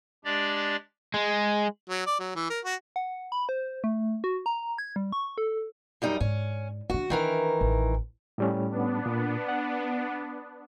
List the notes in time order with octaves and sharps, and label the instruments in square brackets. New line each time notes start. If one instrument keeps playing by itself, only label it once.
[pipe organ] G#3 D4 G4 D5 A6
[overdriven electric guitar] G#3
[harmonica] F#3
D5
F#3
E3
A#4
F#4
[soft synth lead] F#5
B5
C5
A3
F#4
A#5
G#6
G3
C#6
A4
[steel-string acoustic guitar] F#2 G3 D#4
[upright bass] G#2 [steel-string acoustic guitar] C#4
[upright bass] E3 D4 [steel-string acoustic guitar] F#4
[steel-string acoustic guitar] D#3 E3 A#4 [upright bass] D4
[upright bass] A1
[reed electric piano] A2 G3 C#4
[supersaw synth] B3 D4
[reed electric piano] A#2
F#5